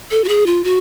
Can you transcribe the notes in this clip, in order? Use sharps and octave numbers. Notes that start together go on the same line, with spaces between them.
A4
F#4
G#4
F4
F#4